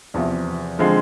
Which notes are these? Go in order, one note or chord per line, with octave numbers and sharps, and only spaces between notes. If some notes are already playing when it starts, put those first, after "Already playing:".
E2 C3 F3
D3 F3 G#3 C4